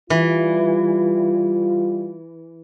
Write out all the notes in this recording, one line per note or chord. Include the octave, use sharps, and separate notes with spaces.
E3 G3 F4